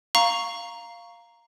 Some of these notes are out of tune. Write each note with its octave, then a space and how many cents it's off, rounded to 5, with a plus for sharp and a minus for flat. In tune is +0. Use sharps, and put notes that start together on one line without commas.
F5 +0 A#5 +0 C#6 +5